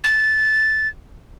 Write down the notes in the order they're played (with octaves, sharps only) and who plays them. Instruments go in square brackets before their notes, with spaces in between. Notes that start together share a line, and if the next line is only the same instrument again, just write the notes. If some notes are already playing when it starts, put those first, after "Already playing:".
[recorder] A6